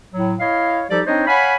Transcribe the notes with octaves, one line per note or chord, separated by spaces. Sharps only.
A2 F#3
E4 C#5 D#5 F5
F3 G3 D#4 G4 A4 D5
C4 D4 D#4 C5 C#5 D#5
C#5 F5 F#5 G#5 B5